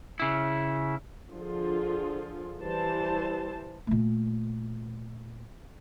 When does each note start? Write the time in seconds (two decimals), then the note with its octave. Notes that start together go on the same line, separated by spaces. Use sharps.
0.20 C#3 E4
1.31 D3 F3 F4 G#4
2.60 E3 G3 C5 A5
3.87 A#2 A3